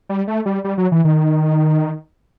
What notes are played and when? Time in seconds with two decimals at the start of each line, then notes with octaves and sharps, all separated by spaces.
0.09 G3
0.28 A3
0.46 G3
0.64 G3
0.78 F#3
0.92 E3
1.05 D#3